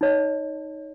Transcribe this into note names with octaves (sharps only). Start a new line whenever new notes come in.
D#4 C#5 D#5